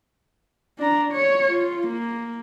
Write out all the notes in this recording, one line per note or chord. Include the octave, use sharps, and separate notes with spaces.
D4 A#5
C#5
F4
A#3